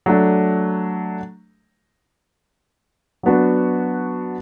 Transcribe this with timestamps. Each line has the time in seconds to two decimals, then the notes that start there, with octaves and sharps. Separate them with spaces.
0.06 F#3 A3 D4
3.23 F#3 B3 D4 F#4